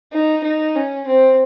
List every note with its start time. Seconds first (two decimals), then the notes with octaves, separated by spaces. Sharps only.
0.12 D#4
0.44 D#4
0.75 C#4
1.07 C4